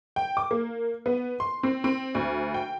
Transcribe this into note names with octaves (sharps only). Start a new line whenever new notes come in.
G5
D6
A#3
B3
C6
C4
C4
D2
G5